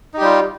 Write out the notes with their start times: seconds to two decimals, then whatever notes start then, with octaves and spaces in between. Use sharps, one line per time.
0.14 D#4
0.17 G4
0.21 G3
0.25 F4